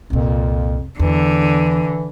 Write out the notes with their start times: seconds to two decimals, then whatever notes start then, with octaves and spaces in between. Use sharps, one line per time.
0.10 C2 F2 A#2
0.99 E2 D3 E3